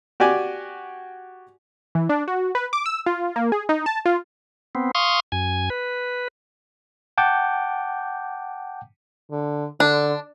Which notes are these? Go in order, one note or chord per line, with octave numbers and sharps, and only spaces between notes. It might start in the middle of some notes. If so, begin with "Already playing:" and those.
F#4 G4 D5 G#5
E3
D4
F#4
B4
D6
E6
F4
A#3
G#4
D#4
A5
F4
B3 C4
F5 C6 C#6 D#6
F#2 G#5
B4
F#5 G5 A5 D6 G6
D3
D3 D4